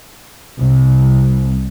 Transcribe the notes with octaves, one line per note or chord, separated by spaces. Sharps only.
C2